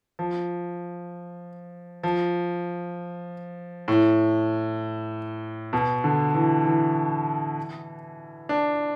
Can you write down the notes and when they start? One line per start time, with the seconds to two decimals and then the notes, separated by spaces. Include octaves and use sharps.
0.19 F3
2.03 F3
3.88 A2
5.73 B2
6.04 D3
6.35 E3
6.65 E3
8.49 D4